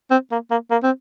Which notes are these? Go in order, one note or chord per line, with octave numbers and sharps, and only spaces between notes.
C4
A#3
A#3
A#3
C4